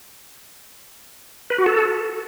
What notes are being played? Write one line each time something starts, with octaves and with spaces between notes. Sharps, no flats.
B4
F#4
A4